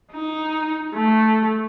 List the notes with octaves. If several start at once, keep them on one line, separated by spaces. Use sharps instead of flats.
D#4
A3